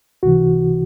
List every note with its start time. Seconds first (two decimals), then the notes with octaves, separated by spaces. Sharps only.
0.23 C#2 C3 E3 F#4